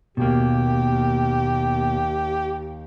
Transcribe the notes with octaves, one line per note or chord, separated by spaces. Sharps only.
D#2 B2 A#3 G4